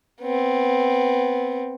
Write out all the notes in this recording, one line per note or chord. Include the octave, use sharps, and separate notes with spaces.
B3 C4